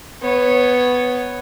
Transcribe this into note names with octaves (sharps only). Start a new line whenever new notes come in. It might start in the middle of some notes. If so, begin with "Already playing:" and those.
B3 C#5